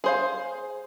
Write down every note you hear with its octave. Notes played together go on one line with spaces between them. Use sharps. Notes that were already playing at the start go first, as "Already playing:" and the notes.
G#4 C5 F5